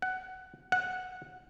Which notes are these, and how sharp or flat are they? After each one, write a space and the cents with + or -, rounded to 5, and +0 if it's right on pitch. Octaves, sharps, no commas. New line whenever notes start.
F#5 +15
F#5 -10